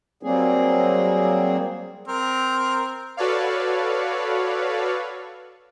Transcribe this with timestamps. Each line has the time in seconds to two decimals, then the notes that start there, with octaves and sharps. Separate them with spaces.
0.23 F#3 G3 A#3 C4 G#4
2.08 C4 A#4
3.17 F#4 A4 B4 C#5 D5 F5